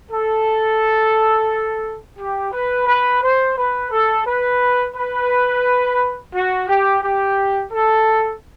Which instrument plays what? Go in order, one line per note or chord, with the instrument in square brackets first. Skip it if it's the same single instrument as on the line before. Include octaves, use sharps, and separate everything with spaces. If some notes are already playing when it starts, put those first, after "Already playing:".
[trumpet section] A4
G4
B4
B4
C5
B4
A4
B4
B4
F#4
G4
G4
A4